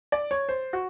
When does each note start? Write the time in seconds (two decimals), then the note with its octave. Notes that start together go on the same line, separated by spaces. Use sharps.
0.12 D5
0.31 C#5
0.49 C5
0.73 F#4